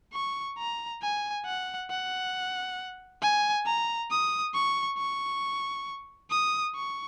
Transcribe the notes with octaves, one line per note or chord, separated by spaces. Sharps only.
C#6
A#5
G#5
F#5
F#5
G#5
A#5
D#6
C#6
C#6
D#6
C#6